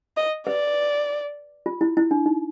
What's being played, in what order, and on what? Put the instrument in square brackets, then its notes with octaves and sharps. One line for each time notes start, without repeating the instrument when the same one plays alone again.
[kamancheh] D#5
[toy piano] B4 [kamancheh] D5
[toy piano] F4
E4
E4
D4
D#4